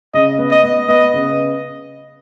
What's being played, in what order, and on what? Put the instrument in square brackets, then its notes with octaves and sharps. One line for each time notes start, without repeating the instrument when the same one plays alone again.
[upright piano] C#3 [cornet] D#5
[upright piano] B3
[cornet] D#5
[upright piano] B3
[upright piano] B3 [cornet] D#5
[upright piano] C#3